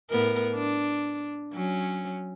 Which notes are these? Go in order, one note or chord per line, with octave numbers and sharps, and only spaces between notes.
A2 B3 A#4
D4
F#3 C#4